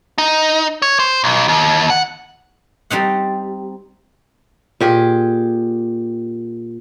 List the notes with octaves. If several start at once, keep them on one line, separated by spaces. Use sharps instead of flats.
D#4
C#5
C5
B1
D#2
F#5
G3 C4 D#4 F#5
A#2 G4 G#4